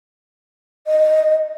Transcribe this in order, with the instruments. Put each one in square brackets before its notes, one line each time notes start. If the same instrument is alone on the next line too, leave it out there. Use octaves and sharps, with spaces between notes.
[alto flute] D#5